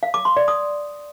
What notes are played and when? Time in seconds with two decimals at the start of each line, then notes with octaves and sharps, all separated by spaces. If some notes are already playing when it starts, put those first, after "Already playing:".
0.03 F5
0.14 D6
0.25 C6
0.37 D5
0.48 D#6